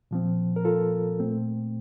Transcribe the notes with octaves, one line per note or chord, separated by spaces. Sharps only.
A#2 F3 C4
A#4
F4 A4
A#2 A3 C4